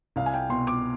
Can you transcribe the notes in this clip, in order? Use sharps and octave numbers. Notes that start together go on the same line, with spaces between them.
C2 F5
G#5
G5
B2 C6
D6